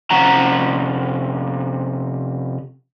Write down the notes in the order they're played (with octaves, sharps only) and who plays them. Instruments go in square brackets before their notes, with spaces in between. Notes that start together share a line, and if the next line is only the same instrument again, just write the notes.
[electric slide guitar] C3 F3 C#4 F#5 A#5